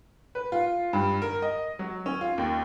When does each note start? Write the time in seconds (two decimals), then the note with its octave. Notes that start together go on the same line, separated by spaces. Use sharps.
0.35 B4
0.52 F4
0.93 G2
1.22 A#4
1.42 D#5
1.79 F#3
2.06 C#4
2.21 F4
2.38 D#2